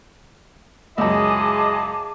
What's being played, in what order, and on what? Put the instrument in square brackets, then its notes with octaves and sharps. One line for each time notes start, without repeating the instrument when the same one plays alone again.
[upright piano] C#2 F#2 [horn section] G#3 E4 D#5 [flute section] G#4 A5 D6